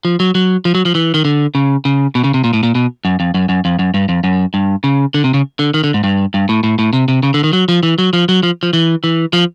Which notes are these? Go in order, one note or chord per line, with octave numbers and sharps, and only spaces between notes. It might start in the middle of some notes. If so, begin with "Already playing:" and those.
F3
F#3
F#3
F3
F#3
F3
E3
D#3
D3
C#3
C#3
B2
C#3
C3
A#2
A2
A#2
B2
F#2
F2
F#2
F#2
F2
F#2
G2
F2
F#2
G2
C#3
D3
C3
C#3
D3
D#3
D3
G#2
G2
G2
A2
A2
A2
C3
C3
C#3
D3
D#3
F#3
F3
E3
F#3
F3
F#3
F3
F3
E3
E3
F3